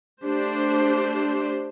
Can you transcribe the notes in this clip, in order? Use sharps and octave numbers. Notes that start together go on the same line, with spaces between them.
A3 D4 G4 C5